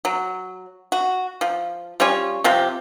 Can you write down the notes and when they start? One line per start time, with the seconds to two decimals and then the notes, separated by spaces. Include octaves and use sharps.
0.05 F#3
0.92 F#4
1.41 F3
2.00 G3 C#4 F4 C#5
2.44 C3 F3 G4